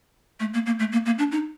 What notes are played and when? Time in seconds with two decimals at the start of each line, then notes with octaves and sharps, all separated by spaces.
0.40 A3
0.54 A#3
0.66 A#3
0.79 A3
0.92 A#3
1.06 A#3
1.19 D4
1.32 D#4